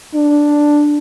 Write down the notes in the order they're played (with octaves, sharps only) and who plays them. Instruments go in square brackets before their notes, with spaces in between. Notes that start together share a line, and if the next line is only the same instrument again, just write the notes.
[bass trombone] D4